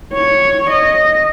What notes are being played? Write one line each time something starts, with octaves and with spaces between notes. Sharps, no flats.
C#5
D#5